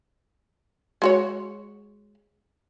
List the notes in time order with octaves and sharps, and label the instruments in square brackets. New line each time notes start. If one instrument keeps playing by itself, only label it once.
[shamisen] G#3 F#4 C#5